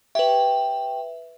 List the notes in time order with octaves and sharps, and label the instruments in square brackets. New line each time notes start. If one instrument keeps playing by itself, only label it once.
[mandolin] G4 C#5 C#6 [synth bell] B4 E5